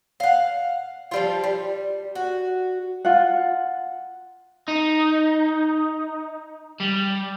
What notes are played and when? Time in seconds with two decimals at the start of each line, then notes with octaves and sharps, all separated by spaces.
0.20 F5 F#5
1.11 F3 G3 F4
1.44 G3
2.15 F#4
3.05 F4 F#5
4.68 D#4
6.80 G3